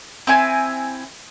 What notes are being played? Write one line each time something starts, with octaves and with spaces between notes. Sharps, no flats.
C4 E4 G#5